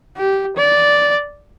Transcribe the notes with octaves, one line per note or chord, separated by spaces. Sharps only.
G4
D5